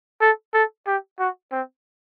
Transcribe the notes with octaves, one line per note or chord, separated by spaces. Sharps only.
A4
A4
G4
F#4
C4